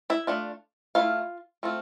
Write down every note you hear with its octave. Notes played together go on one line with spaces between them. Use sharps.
E4 E5
A3 D4 F4
A3 E4 F4 F5
A3 C4 F4